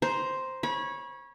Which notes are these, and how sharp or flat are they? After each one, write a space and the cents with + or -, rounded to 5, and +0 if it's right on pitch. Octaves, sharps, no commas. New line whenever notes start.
C5 +0 A#5 +15
C#5 -10 B5 -35